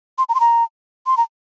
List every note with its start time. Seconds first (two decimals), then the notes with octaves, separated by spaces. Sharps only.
0.18 C6
0.29 A#5
0.35 C6
0.40 A#5
1.06 C6
1.17 A#5